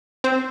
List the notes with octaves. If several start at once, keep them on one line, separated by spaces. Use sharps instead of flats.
C4 C5